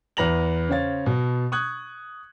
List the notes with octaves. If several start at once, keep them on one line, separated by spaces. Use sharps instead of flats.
E2 B4 A#5 A#6 F7 F#7
C#3 C5 C#5 F5 A6
B2
C#6 D#6 F#6 G#6